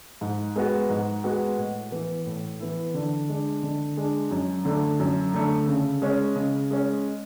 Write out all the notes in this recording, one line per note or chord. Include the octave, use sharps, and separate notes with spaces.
G#2
G#3 B3 F#4
G#2
G#3 B3 F#4
A2
E3 B3 E4
A2
E3 B3 E4
D3
G#3 D4
D3
G#3 D4
F#2
D3 A3
F#2
D3 A3
C#3
G#3 C#4
C#3
G#3 C#4